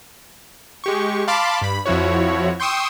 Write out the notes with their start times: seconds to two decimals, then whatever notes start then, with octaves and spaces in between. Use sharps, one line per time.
0.84 G#3 G4 C#6
1.28 F5 A5 B5 C6 D6
1.62 G2 B5
1.86 F2 F3 E4 F#4 C#5
2.60 G5 C6 C#6 D#6 E6